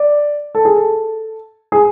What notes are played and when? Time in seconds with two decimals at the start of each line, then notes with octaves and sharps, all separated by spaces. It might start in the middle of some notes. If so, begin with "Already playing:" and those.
Already playing: D5
0.55 A4
0.65 G#4
0.76 A4
1.72 G#4